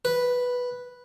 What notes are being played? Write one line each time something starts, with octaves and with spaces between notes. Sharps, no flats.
B4